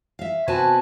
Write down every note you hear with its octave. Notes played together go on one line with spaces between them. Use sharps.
E5 F5
C3 B3 F#4 B4 G#5 A5